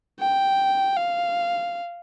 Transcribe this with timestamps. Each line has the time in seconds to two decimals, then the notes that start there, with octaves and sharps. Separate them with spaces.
0.20 G5
0.97 F5